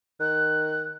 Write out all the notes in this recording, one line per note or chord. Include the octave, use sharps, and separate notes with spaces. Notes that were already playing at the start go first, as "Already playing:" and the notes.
D#3 F#6